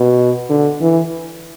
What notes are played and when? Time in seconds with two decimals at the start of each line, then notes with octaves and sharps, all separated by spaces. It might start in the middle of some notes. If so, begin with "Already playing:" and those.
Already playing: B2
0.49 D3
0.81 E3